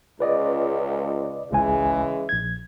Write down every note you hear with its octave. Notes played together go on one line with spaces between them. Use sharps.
C#2 B4 D5 D#5
G#1 C#2 C#3 E3 G#3 G#5
A#1 G#6